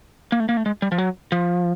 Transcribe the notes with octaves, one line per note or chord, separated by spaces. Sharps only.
A#3
A3
A#3
A3
G#3
G3
F3
F#3
F3